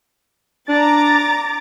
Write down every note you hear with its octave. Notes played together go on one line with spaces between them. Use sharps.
D4 A#5 D6 A6